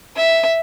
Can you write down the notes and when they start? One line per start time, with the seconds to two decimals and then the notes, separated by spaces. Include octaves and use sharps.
0.17 E5